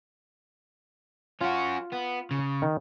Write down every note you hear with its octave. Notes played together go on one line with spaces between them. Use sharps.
C#4 F4 F#4
B3
C#3
D#3